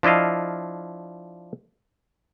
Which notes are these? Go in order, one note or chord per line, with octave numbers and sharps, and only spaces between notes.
F3 D4 E4 D#5 F5